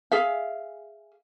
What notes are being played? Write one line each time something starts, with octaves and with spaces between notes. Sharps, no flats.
G#4 E5 F5